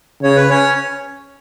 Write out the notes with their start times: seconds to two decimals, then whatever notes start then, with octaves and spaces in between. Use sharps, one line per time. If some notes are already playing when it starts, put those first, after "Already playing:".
0.23 C#3 C#5
0.36 B4
0.50 C#4 C#5